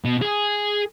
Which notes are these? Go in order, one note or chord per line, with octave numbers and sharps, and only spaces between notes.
B2
G#4